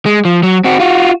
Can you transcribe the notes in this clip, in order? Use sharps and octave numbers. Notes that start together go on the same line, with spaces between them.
G#3
F3
F#3
C4 F#4
F4 F#4